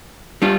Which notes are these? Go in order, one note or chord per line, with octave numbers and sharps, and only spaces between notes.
G3 D4 F4